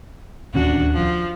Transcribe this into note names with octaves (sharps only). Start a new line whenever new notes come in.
D1 D#2 C#4 D4 F#4
F3